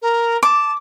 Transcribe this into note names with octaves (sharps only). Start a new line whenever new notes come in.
A#4
A5 D6